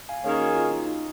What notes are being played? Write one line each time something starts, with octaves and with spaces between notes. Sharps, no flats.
F5 G#5
D#3 A#3 C#4 G#4 C#5 F5
F#4
F4
D#4
D#4